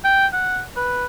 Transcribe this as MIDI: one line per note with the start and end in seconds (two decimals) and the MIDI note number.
0.04 0.27 79
0.33 0.61 78
0.76 1.06 71